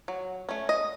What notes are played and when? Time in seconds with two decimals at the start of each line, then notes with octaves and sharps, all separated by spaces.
0.08 F#3
0.49 A3 C#4
0.69 D#5